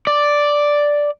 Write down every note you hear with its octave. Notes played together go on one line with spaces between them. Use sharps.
D5